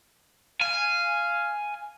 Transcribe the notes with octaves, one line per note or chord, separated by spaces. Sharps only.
F5 G#5